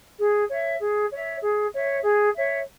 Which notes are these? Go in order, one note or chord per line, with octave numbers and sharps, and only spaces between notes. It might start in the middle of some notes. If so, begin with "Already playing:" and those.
G#4
C#5 E5
G#4
C#5 E5
G#4
C#5 E5
G#4
C#5 E5